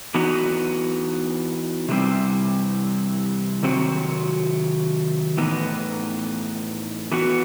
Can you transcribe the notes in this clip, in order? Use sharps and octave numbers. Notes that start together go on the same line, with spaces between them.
E3 B3 D#4 F#4
C3 E3 G3 C4
C3 D#3 F#3 C4 F#4
A2 E3 B3 D#4
E3 B3 F#4